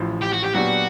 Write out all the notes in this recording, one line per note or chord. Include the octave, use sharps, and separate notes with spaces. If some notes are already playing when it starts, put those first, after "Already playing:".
Already playing: A1 A2 F3
G4
F#4
G4
A#2 F#3 B3 D4 F#4 G4